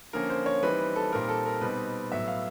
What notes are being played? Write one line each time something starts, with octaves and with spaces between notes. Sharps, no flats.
D3 F3 A#3 C#4 A#4
C5
C#5
E3 G3 C4 D#4 B4
A4
A#2 G3 C4 D#4 A#4
A4
A#4
B2 G3 C4 D#4 B4
A2 F#3 B3 E5
F5